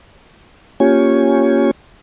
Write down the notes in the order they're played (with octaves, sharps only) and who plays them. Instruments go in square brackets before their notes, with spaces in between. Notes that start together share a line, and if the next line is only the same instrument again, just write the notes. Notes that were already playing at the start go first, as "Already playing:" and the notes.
[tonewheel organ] A#3 C#4 F4 G4 C#5 G#5